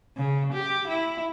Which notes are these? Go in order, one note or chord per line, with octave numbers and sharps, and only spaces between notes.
C#3
G4
E4